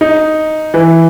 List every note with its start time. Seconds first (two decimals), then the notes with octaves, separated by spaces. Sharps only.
0.01 D#4
0.74 E3